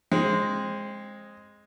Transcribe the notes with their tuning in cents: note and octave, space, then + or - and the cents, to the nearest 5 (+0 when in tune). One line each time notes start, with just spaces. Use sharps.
G#3 +0 C4 +25